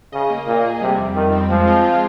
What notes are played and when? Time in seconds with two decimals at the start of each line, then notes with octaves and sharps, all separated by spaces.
0.13 C#3 D#5
0.30 A#3
0.47 A#2 A#3
0.65 G#4
0.81 C3 G3
0.98 F2
1.15 F2 D#3
1.32 C4
1.50 F3 G#3
1.67 F4
1.84 F4